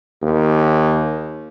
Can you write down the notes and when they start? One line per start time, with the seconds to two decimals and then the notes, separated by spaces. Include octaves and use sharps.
0.22 D#2